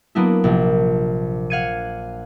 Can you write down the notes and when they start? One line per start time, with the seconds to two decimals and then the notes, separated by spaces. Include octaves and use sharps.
0.15 F#3 A#3 B3 D4 E4
0.44 A#1 C3 F3
1.50 F5 F#5 G#6 C#7 D#7